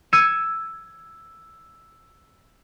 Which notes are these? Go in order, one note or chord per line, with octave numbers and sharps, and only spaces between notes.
E6 G#6 C#7 D#7 E7